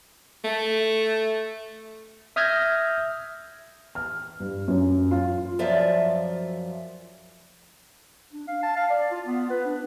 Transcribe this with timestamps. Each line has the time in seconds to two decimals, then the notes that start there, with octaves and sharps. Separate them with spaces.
0.44 A3
2.36 E5 D#6 F6 G6 G#6 A#6
3.95 F6
4.40 G2
4.68 F#2
5.11 F4
5.59 F#2 F3 F4 D5 E5
8.33 D4
8.47 F5
8.63 A5
8.76 F5
8.90 D5
9.12 F4
9.27 B3
9.50 B4
9.65 D4